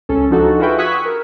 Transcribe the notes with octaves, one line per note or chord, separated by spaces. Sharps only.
C#2 C#4 A4
F3 D4 D#4 F#4 A4
F4 F#4 G#4 B4 E5 G5
C#6 D#6 E6 F#6 G#6 B6
A#4